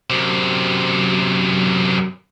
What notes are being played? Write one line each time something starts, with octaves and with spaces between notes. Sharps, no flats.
F#2 C3